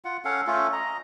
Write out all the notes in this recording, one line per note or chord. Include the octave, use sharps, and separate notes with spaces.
F4 F#5
C#4 A4 F5 F#5
A3 C#4 F4 A4
D#5 A#5